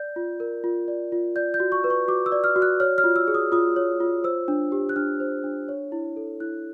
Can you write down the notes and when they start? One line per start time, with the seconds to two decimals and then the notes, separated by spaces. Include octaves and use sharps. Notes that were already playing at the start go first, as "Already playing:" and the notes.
Already playing: D5 G6
0.16 F4
0.40 A#4
0.64 F4
0.88 D5
1.12 F4
1.36 D5 G6
1.54 G6
1.60 F#4
1.72 C#6
1.84 B4
1.90 C#6
2.08 F#4 D6
2.26 E6
2.32 D5
2.44 F6
2.56 F#4
2.62 F#6
2.80 C#5 F6
2.98 F6
3.04 F4
3.16 E6
3.28 G#4
3.34 D#6
3.52 F4 D#6
3.76 C#5
4.00 F4
4.24 C5 E6
4.48 D4
4.72 G4
4.89 F#6
4.96 D4 F6
5.20 C5
5.44 D4
5.69 C#5
5.92 E4
6.16 A4
6.40 E4 F#6